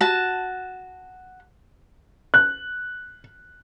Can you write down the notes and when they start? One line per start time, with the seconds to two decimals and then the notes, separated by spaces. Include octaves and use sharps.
0.01 F#4 A5
2.34 F#6